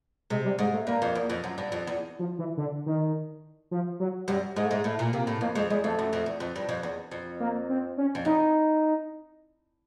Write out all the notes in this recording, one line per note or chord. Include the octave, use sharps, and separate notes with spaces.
C3 G#3
G3
G#2 G#3
A3
G2 A#3
F2
E2
F2
F#2
G2
F2
E2
F3
E3
D3
D#3
F3
F#3
F#2 G3
G#2 G#3
A3
G#2 G#3
A2 A3
A#2
C3 A#3
A2
F2 A#3
F2 G#3
E2 G#3
F2 A3
F#2
F2
E2
F2
G2
F2
E2
F2
A#3
C4
C#4
F2
E2 D#4